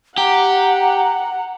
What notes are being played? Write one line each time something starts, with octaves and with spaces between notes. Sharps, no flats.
G4 F#5 A#5